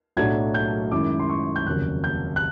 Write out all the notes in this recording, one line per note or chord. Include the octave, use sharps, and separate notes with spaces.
B1 A2 F#3 A3 D4 G#6
G6
F#2 D#3 G#3 C#4 E4 D6
C6
C#6
G6
F1 D#2 C#3 F#3 F#6
G6
F#6